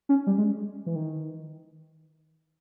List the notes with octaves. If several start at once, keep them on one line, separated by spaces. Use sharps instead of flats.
C#4
G3
G#3
E3
D#3